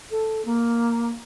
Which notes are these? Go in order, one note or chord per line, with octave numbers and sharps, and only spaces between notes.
A4
A#3